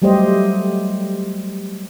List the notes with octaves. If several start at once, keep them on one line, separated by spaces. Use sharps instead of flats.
F#3 G3 A3 G4 C5 D#5